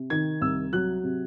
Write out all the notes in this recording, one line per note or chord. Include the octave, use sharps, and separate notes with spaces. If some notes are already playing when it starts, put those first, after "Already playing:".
Already playing: C3
D#3 G#6
C2 E6
F#3 F#6
C3